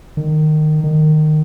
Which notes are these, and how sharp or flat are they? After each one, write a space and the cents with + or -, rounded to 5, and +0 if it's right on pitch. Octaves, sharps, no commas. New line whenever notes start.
D#3 -20
D#3 -20